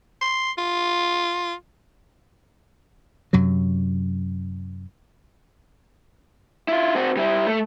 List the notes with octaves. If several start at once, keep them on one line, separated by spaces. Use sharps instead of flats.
C6
F4
F#2 C3 F#3
E4 F4
C4 F#4
G3 E4
A3